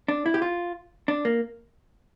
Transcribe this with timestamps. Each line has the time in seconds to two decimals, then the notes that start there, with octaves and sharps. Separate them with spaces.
0.08 D4
0.26 E4
0.34 G4
0.42 F4
1.08 D4
1.25 A#3